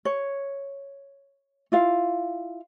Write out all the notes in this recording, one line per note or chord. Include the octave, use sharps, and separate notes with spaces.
C#5
E4 F4 F5